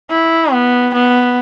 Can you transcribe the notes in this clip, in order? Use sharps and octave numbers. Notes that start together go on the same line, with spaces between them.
E4
B3
B3